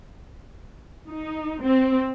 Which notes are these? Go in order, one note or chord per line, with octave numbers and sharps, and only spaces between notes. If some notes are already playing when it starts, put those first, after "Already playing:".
D#4
C4